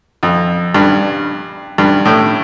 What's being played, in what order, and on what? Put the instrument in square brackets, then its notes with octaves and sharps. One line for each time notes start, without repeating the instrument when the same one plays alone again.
[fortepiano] F2
G2
G2
A2